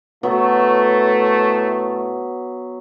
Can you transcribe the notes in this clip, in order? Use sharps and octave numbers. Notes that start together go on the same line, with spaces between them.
A2 F#3 A3 B3